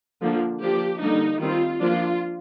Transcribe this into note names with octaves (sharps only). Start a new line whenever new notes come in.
D3 F3 A#3 D4
F3 A#3 D4 G4
D3 G3 A#3 D4 D#4
D#3 G3 C4 F4
F3 A#3 D4 F4